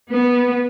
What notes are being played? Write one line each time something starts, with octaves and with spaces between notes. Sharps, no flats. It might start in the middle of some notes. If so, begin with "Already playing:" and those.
B3